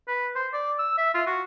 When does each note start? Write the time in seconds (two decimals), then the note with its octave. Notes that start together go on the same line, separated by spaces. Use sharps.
0.08 B4
0.35 C5
0.53 D5
0.79 E6
0.98 E5
1.14 F4
1.26 F#4